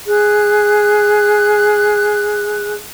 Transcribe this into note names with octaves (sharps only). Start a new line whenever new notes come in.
G#4 F#6